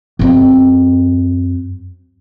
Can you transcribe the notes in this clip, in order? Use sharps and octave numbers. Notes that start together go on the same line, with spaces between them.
F#2 C4